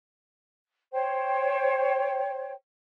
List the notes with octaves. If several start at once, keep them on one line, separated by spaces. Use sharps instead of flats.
C5 C#5 G5